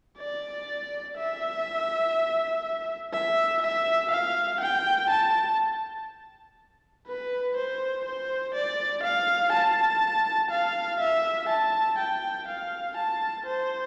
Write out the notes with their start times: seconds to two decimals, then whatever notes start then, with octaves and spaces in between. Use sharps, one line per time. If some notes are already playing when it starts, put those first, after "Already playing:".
0.18 D5
1.16 E5
3.13 E5
3.62 E5
4.11 F5
4.61 G5
5.10 A5
7.07 B4
7.56 C5
8.05 C5
8.54 D5
9.03 F5
9.53 A5
10.51 F5
11.00 E5
11.49 A5
11.98 G5
12.48 F5
12.97 A5
13.46 C5